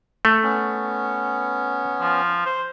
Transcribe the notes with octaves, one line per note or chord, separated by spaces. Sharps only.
A3
B3 C#4
F3
C5